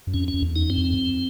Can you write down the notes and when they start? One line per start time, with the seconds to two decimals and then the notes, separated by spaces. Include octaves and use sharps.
0.07 F#2
0.14 F2 C#4
0.28 C#4
0.34 F2
0.42 E2
0.56 D#4
0.70 F#2 C4
0.78 F2
0.86 E2
0.94 F2